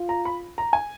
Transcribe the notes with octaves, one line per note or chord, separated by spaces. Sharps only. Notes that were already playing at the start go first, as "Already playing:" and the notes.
Already playing: F4
A#5
B5
A#5
G#5